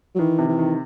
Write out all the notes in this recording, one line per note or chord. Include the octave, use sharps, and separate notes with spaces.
F#3
D#3 E3
C3
E3
D#3